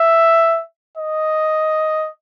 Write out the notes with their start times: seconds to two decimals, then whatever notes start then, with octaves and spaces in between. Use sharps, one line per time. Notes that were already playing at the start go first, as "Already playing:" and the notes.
Already playing: E5
0.97 D#5